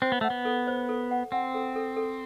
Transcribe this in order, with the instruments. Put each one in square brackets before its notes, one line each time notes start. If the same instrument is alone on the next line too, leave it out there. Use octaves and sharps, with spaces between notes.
[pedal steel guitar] C4 [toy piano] C5
[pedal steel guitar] B3
[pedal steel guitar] A3 [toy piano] F#5
[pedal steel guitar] B3
[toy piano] A4
C5
A4
F#5
[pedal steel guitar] C4 [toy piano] F#5
[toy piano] A4
A4
A4